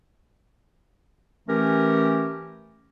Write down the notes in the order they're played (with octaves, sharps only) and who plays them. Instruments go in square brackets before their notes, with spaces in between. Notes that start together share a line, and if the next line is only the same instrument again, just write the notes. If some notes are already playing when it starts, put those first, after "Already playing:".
[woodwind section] E3 A3 C#4 G4 A#4